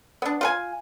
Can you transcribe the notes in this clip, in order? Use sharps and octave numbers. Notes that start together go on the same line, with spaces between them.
B3 D4
F4 B4 G#5